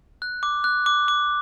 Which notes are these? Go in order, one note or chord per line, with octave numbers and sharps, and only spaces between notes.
F#6
D6
F#6
D6
D6